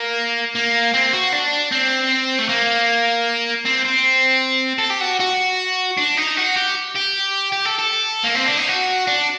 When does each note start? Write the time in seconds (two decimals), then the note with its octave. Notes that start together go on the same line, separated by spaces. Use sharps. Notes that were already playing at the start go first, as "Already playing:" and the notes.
Already playing: A#3
0.55 A#3
0.94 C4
1.13 F#4
1.33 D4
1.71 C4
2.39 A3
2.49 A#3
3.65 C4
3.85 C4
4.79 A4
4.90 G4
5.01 F#4
5.20 F#4
5.97 D4
6.17 D#4
6.37 F#4
6.56 G4
6.95 G4
7.52 G4
7.65 A4
7.79 A4
8.24 A#3
8.35 C4
8.46 D4
8.58 D#4
8.69 F#4
9.07 D4